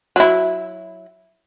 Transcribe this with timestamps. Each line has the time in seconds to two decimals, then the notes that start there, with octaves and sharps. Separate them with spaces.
0.16 F#3 E4